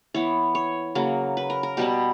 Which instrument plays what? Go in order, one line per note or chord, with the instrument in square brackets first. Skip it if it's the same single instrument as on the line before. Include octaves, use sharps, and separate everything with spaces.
[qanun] E3 B3 C#5
C#5
C#3 F#3 A#3
B4
A#4
A#4
B2 G3 B3 G4